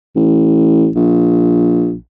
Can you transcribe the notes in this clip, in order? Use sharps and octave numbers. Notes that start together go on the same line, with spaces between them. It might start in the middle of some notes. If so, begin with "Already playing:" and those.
A1
A#1